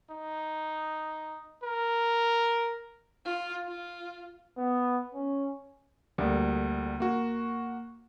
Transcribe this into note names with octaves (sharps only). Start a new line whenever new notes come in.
D#4
A#4
F4
F4
B3
C#4
D2 G3 A#3
A#3 F#4